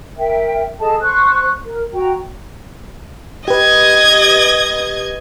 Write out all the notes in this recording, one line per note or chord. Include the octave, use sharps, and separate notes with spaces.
A#4 E5 G5
G#4 A4 D#5 A5
C5 C#6 F#6
A#4
F#4 G5 A#5
G4 B4 D#5 G#6